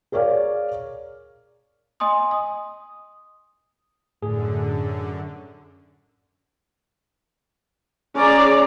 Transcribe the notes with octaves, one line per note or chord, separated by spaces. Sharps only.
G#4 A#4 C#5 D5 F5
D#5 G#5 C6 D#6
D#6
F#2 A2 D3 G#4
C#4 G#4 D5 A#5